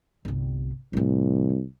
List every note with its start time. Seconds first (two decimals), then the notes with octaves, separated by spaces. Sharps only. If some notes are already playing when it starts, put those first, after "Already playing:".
0.25 G1 C2
0.93 C2 A2 E3